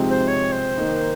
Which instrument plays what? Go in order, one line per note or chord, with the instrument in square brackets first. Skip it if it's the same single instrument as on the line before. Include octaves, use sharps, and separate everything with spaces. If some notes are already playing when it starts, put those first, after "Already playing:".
Already playing: [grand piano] C3 F3 G#3 C4 D#4
[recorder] C5
C#5
C5
[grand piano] D#3 A#3 D#4